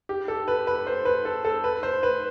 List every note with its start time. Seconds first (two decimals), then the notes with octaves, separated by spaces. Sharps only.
0.09 G4
0.28 A4
0.48 B4
0.67 B4
0.87 C5
1.05 B4
1.25 A4
1.45 A4
1.64 B4
1.83 C5
2.03 B4